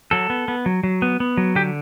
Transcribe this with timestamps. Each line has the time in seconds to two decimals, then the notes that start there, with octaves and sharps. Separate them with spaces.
0.11 F#3 A4
0.30 B3
0.48 B3
0.66 F#3
0.83 F#3
1.02 B3
1.20 B3
1.37 F#3
1.55 D3 G4